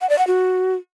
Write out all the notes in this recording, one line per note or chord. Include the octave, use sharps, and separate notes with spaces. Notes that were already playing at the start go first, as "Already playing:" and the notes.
F#5
D5
F#5
F#4